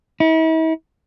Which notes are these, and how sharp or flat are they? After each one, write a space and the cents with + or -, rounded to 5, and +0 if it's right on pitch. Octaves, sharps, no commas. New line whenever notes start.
E4 -45